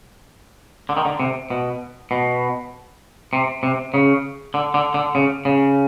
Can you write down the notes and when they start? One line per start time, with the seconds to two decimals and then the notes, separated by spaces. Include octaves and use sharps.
0.89 D3
0.97 D#3
1.05 D3
1.20 C3
1.50 B2
2.11 B2
3.33 C3
3.63 C3
3.94 C#3
4.54 D3
4.74 D3
4.94 D3
5.15 C#3
5.45 C#3